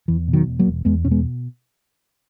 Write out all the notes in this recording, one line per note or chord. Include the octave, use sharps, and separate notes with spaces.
E2 E3
B2
D#3 F#3
E1
F#3 A#3
E1
E2 G#3 B3
B2 C#4
G#3 B3